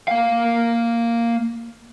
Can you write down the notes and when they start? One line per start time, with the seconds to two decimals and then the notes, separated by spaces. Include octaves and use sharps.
0.08 A#3 F5